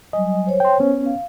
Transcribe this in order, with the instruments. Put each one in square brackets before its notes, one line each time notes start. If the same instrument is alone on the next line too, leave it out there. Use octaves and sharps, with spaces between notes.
[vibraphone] F#3 G3 G#5 [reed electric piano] D#5
[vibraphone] C5 C#5
[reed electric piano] G5 C6
B3 C#4
[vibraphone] F5